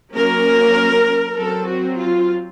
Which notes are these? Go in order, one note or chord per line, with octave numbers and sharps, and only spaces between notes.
F#3 A#3 C#4 A#4
F#3 C4 A4
F#4
F4